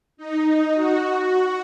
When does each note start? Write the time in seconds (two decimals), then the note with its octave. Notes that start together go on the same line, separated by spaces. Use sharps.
0.17 D#4
0.46 D#4
0.74 F#4